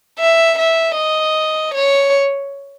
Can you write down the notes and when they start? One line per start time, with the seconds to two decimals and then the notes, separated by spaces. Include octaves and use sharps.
0.19 E5
0.59 E5
0.96 D#5
1.74 C#5